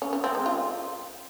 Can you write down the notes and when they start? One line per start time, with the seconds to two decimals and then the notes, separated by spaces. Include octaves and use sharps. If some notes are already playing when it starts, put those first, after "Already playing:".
0.02 C#4
0.13 C#4
0.24 C4
0.35 G#3
0.46 F4